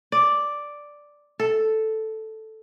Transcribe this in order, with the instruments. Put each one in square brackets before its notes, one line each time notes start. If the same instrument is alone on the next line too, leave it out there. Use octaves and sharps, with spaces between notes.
[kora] D5
A4